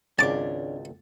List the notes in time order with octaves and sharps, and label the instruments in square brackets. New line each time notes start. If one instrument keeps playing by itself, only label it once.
[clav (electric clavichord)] G#1 C#2 [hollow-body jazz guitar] C#4 D4 [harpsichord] A5 D6